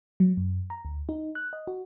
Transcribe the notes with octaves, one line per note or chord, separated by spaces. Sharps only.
F#3
F#2
A#5
D2
D#4
F#6
D#5
F#4